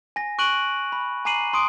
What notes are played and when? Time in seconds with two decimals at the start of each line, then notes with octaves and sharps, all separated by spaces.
0.16 G#5 A#6
0.39 C#6 F#6 D7 D#7 F#7
0.92 B5
1.25 G#5 A#5 D6 C7 D#7 F#7
1.53 C6 D#6 D7